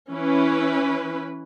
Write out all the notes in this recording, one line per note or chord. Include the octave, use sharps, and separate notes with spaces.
E3 C#4 E4 B4